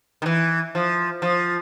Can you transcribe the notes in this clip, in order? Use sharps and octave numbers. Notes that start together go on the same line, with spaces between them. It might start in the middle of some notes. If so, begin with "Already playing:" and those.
D#3
E3
F3
F3